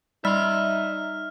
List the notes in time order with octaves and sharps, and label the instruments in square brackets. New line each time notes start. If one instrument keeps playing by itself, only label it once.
[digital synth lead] G3 [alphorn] D#4 [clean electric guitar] E5 C6 [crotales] F6